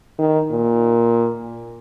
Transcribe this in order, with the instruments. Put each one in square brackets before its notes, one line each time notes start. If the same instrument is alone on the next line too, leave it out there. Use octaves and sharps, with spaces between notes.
[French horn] D#3
A#2